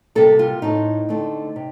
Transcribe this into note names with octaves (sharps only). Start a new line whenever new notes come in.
C3 G3 A#3 A4
F4
A2 A3 C4 D#4
D3 A3 C4
C3